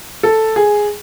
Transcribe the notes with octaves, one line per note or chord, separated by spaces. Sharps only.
A4
G#4